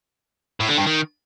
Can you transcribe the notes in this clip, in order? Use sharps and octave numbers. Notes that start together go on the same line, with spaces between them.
A2
D3
G2
D#3